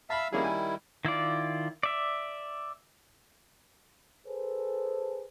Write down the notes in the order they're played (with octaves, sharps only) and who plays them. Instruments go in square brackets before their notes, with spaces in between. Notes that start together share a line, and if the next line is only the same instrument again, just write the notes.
[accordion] E5 F5 E6 [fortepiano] A5 B5
[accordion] D#3 G3 E4 [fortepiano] A#3 C#4 G#4
[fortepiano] G#5
[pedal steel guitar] D#3 E4 F4 D5
D5 E5
[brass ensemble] G#4 A4 B4 C5